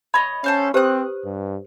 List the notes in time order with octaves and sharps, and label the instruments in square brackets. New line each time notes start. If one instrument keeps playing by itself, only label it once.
[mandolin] C#5 D#5 [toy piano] B5
[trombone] C#4 [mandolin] A4 C5 F5
[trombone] C4 [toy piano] G4 B4 C5 [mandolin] D#6 F#6
[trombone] G2